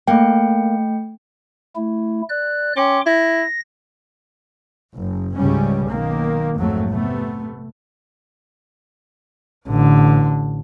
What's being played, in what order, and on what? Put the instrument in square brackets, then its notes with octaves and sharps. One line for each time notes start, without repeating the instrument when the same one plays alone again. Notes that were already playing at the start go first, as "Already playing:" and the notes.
[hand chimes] A3 G5 [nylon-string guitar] A#3
[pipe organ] A3 E4
D5 F#6
[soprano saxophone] C#4 [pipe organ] G5 C6 D6
[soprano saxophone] E4 [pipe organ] A#6
[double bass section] F#1
C#2 G#2 C#3 G3 C#4
B1 D#3 A#3
A#1 F2 G#2 F#3 A3
C3 A3 B3
[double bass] A1 D3